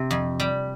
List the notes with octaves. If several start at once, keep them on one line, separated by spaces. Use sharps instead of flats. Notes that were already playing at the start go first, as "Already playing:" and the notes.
Already playing: C3 G4
F2
G3